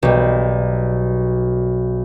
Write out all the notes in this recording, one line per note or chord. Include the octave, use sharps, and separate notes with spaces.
B1 G3